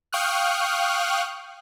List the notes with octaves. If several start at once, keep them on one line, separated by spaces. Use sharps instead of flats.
F5 G5 C#6 D#6 F6 F#6